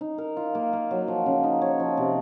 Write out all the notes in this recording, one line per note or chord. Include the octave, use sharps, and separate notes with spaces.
D#4
A#4
F4
A#3
A#3
F#3
F3
C#3
D#4
C#5
F3
C3